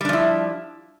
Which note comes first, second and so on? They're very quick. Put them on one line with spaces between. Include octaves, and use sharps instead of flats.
G3 D4 F3 E4